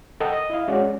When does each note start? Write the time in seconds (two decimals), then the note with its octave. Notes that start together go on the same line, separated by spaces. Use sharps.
0.20 A4 A#4 D#5 F#5 G5 A5
0.33 D#5
0.50 E4 D#5 F5
0.68 G#3 C#4 F#4 D5